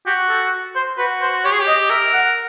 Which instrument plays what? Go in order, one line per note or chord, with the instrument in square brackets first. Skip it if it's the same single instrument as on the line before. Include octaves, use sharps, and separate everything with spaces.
[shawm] F#4 [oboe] G4
[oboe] A4
C5
[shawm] F#4 [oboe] B4
[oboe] C5
[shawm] G4 [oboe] C#5
[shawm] G#4
G4
[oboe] D#5
[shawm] A#4 [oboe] E5
[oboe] F#5